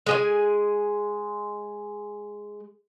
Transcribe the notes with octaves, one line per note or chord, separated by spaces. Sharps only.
G#3 G#4 G#5